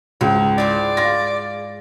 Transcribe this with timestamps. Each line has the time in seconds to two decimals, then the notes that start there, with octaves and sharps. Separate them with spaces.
0.21 C#2 G#2
0.58 E4 G#4 C5 D5
0.97 F4 G#4 A#6